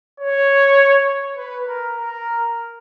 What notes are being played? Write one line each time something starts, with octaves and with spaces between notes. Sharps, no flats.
C#5
B4
A#4
A#4